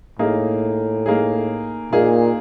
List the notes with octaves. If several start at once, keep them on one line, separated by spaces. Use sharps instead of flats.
A2 A#3 D#4 G#4
A#3 D#4 G#4
A#2 A#3 D#4 G#4